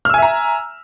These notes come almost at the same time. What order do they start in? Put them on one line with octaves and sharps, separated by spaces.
F6 E6 G#5 E5 A#5